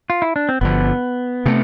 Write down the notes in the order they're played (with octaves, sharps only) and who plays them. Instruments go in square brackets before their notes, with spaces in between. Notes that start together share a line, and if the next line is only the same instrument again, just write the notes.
[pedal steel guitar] F4
E4
D4
C4
[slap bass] G1 F2 D3 F3 [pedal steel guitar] B3
[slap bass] C3 F3 A3